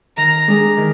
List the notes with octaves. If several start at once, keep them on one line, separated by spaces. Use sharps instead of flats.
D#3 A#5
G#3 D4 G#4
D#3